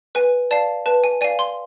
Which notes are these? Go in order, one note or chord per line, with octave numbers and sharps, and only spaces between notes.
B4 G#5
D5 F5 A5
B4 A5
G#5
D5 F5 G#5
C6